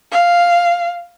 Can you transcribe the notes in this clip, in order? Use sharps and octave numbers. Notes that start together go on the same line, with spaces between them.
F5